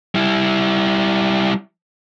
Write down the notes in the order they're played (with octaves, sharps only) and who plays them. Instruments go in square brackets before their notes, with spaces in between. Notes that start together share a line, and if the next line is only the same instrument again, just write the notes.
[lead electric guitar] G3 E4